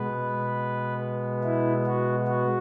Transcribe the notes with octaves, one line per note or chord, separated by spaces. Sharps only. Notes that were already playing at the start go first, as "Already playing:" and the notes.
Already playing: B2 G#3 B3 B4
E4
F#4
F#4